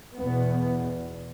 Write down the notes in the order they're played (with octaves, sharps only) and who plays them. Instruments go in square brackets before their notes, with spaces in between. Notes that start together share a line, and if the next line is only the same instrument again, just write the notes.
[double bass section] E2 B2 B3